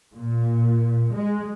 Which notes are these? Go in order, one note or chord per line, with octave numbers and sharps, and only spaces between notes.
A#2
G#3